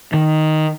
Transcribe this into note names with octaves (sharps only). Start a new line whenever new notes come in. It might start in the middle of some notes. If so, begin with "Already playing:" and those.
D#3